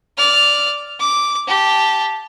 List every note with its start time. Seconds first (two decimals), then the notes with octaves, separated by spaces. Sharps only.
0.18 D5 F6
1.00 D6
1.47 G4 A5